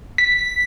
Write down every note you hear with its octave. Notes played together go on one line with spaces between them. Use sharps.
B6